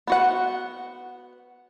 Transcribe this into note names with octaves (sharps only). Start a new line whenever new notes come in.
B3 F#4 F#5